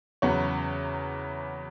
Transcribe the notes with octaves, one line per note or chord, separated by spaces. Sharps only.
E2 C#3 F#3 B3 C#5